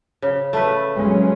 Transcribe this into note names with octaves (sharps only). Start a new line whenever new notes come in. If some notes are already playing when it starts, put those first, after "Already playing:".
C#3
A3 B4
F#3 G#3 C#4